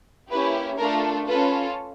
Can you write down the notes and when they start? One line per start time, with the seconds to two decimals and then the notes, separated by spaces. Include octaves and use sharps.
0.30 A#3 C#4 E4 G4 B4
0.78 A3 D4 F4 A4 A#4
1.27 C#4 F4 A4 B4